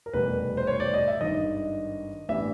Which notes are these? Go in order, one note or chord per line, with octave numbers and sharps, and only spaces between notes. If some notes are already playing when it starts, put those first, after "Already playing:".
A#4
F1 E2 B2 G3 B4
C5
C#5
D5
D#5
E5
G#1 G2 D#3 D#5
A1 G2 E3 G3 B3 E5